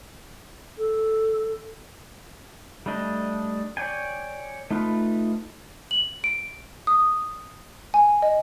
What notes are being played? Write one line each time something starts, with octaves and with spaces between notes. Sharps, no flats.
A4
G3 A3 D4 D#5
C#5 D5 G5 G#5
A3 D#4 F4 B4
F#7
D7
D#6
G#5
D#5